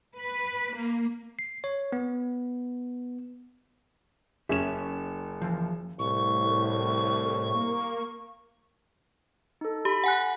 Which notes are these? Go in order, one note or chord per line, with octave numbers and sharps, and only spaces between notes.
B4
A#3
C7
C#5
B3
F#1 C#4 E5 E7
E3 F3
C2 A2 C#6
A#3
D#4 A4
G4 B5 B6
F#5 G#5 F#6